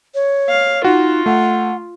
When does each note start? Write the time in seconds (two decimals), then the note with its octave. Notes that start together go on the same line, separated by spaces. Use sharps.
0.15 C#5
0.49 F5
0.84 D#4 F4 F#4
1.26 A3 F#5